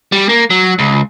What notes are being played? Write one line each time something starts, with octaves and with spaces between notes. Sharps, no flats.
G3
A#3
F#3
C#2